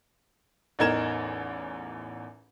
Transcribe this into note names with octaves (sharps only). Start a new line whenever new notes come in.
A1 E2 D#4 A#4 G#6 E7